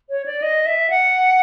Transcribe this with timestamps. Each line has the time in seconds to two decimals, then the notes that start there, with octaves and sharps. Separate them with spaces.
0.10 C#5
0.26 D5
0.42 D#5
0.66 E5
0.90 F#5